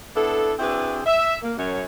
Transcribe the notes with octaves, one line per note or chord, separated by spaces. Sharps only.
B3 D4 E4 A4
C4 D4 E4 F#4 G#4 B4
E5
A#3
F#2 F#3 C#5